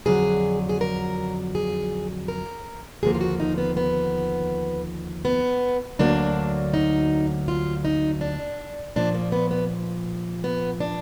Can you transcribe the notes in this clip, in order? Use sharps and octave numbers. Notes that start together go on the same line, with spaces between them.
F2 D3 F#3 G#4
G#4
A#4
G#4
A#4
D#2 D3 F3 A#3 G#4
F4
F#4
D#4
B3
B3
B3
D2 D3 F#3 A#3 D4
D#4
F4
D#4
D4
A#2 F3 A#3 D4
A#3
B3
B3
B3
D4